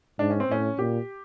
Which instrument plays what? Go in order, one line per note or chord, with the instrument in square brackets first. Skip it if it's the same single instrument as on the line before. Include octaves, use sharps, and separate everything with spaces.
[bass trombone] G#2 [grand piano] D4
[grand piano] C#4
C4
[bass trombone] A2 [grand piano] C#4
[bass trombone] A#2 [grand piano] G4